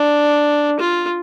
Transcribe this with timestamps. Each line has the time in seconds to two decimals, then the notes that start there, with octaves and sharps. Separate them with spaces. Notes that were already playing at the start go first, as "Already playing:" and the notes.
Already playing: D4
0.80 F4